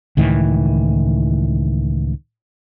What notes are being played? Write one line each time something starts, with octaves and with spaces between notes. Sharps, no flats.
C#2 A2 D#3 E3